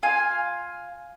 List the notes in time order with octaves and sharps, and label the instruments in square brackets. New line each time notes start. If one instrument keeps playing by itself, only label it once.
[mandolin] F4 F5 G#5